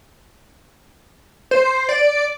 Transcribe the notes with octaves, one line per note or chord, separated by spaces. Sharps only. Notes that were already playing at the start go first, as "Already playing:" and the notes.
C5
D5